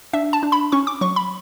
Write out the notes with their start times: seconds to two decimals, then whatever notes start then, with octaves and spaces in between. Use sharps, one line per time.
0.13 D4 E5
0.33 A5
0.43 D4
0.52 B5
0.72 C#4 C#6
0.87 D6
1.01 F#3 C#6
1.16 B5